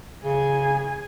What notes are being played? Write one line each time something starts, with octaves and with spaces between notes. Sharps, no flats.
C#3 G#4 G#5